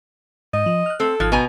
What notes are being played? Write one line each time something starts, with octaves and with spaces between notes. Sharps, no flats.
G#2 D#5
F3
F6 F#6
C4 A4
G#1 F3 F#6 G#6
B2 B3 G#5 A#5